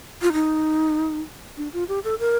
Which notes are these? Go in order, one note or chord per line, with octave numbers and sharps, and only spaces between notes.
F4
D#4
D4
F4
G4
A4
A#4